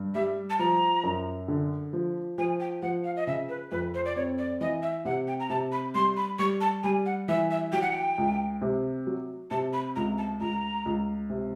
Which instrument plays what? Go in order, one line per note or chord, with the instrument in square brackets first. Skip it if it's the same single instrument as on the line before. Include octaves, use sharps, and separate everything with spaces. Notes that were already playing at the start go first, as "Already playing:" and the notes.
Already playing: [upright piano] G2
[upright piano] G3 [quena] E5
[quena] A5
[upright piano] F3 [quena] A#5
[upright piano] F#2
D3
F3
[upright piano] F3 [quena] G#5
[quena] G5
[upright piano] F3 [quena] F#5
[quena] F5
D#5
[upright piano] C#3 [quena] E5
[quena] B4
[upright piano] F2 [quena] B4
[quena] C5
D5
[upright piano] C4 [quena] C#5
[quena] D5
[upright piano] E3 [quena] D#5
[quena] E5
[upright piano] C3 [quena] F#5
[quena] G5
A#5
[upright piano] C3 [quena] A5
[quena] B5
[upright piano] G3 [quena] C6
[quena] B5
[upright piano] G3 [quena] C#6
[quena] A5
[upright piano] G3 [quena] G#5
[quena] F#5
[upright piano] E3 [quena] E5
[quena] E5
[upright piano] F#3 [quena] G5
[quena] F#5
G5
[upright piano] C#2
C3
F#3
[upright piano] C3 [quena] A5
[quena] B5
[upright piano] C#2 [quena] A#5
[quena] A5
[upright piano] C#2 [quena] A#5
[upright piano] C#2
C3